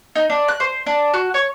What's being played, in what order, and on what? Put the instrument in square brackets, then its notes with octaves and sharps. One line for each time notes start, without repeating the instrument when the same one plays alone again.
[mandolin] D#4
D4
F#6
C5
D4
F#4
C#5